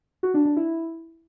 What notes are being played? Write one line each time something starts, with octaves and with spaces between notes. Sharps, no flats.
F#4
D4
D4
E4